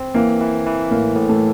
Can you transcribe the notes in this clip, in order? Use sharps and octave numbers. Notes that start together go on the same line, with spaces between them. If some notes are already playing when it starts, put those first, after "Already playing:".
Already playing: C4
E3 A#3
E3
E3
A2 A#3
A2
A3